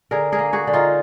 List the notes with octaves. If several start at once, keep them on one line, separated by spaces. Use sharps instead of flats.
D3 G#4 A#4
G#4 A#4
A#3
F#4 G#4
D3
D#4 F4